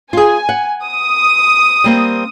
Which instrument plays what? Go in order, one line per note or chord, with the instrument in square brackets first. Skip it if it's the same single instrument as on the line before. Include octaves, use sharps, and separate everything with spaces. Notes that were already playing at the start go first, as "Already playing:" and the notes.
[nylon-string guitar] F4 G#4 [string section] G#5
[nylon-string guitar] F#5
[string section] D#6
[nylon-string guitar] G3 A#3 C4